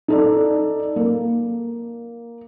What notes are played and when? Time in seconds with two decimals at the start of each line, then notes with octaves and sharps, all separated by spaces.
0.08 D#4 A4 D5
0.96 A#3